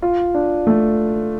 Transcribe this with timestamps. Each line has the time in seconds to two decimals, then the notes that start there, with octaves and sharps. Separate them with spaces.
0.02 F4
0.34 D4
0.67 A3